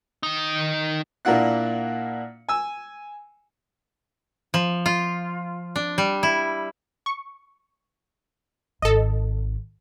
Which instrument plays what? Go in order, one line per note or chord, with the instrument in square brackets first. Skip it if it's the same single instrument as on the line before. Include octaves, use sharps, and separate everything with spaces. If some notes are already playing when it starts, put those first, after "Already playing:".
[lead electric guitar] D#3 D#4
[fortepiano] A#2 A#3 D4 E4 F#5 F#6
G#5 E6
[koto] F3
F4
D4
G3
E4
[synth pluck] C#6
[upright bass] G#1 [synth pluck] A4 D#5